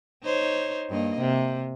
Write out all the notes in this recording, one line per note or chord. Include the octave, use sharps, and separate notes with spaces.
D#4 C5 C#5
G2 A#3 D#5
C3